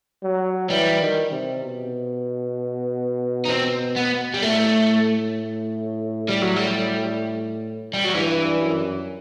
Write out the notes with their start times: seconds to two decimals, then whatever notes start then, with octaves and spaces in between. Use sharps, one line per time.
0.23 F#3
0.70 E3 G3
1.00 D#3
1.32 C3
1.63 B2
3.45 D#4
3.49 C4
3.96 B3
4.34 G3
4.42 A2 A3
6.29 G3
6.42 F#3
6.56 G3
7.93 G3
8.04 F#3
8.15 G2 E3
8.62 F#2